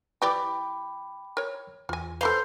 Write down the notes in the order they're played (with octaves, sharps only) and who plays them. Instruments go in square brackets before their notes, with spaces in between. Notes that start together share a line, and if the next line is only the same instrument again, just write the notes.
[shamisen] E3 G4 D5 [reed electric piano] G5 B5 D6
[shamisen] A#4 C#5
[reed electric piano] E2 [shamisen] F4 G#5
[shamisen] A4 B4 F5 [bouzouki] C5